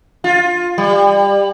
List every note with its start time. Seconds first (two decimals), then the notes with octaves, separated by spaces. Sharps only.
0.24 F4
0.78 G3